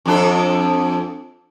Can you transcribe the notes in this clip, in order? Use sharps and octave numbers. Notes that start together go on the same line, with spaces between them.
F2 D4 A4